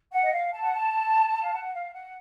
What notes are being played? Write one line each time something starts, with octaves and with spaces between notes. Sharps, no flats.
F#5
D#5
F5
A5
F#5
A5
F5
F#5
F5
F#5